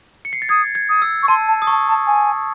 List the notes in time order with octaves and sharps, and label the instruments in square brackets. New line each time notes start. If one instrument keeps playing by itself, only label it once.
[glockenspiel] C#7
C7
A6
[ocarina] D#6 [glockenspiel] G#6
[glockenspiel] G#6
[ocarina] D#6
[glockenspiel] E6
[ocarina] C#6
[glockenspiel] A5 [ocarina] C6
[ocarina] A5
[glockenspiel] D#6
[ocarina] A5 [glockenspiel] C#6
[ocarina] A5
G#5